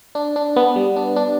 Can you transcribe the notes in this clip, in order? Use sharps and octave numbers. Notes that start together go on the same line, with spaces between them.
D4
D4
B3
G3
D4
D4